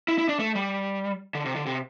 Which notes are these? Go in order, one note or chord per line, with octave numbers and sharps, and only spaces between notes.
E4
E4
D4
A3
G3
D3
C3
D3
C3